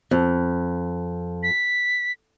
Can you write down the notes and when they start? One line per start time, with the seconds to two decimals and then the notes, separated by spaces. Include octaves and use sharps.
0.11 F2
1.43 B6